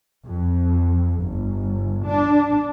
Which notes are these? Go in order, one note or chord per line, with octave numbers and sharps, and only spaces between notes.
F2
G1
D4